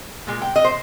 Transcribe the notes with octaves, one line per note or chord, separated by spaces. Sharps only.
A#2 G#3
G5
D#5
C5